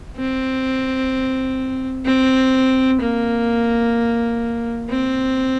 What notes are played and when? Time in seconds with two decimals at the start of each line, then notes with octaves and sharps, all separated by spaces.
0.17 C4
2.05 C4
3.01 A#3
4.89 C4